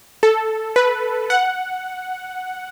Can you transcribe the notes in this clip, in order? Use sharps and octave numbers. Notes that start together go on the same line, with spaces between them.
A4
B4
F#5